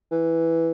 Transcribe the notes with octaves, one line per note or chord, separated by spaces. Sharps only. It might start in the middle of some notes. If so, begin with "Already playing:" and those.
E3